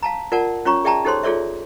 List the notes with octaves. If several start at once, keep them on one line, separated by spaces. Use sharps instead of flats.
F5 A5 A#5
F4 A#4 D5 F#5 A5
C#4 F4 C#5 A#5 C#6
G#4 D5 E5 G5 A5 A#5
D#4 G4 A4 C5 C#5 C6
F4 G#4 A4 C#5 D5 E5